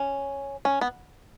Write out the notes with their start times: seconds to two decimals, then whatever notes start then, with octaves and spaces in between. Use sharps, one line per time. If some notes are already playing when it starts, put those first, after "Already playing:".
Already playing: C#4
0.65 C#4
0.81 B3